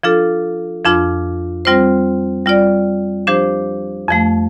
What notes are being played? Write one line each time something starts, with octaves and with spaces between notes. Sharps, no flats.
F3 D4 F4 A4
F2 F3 D4 F4
G3 C4 F4 C5
G3 F4 D5
F3 D4 G4 C5
F2 F3 A3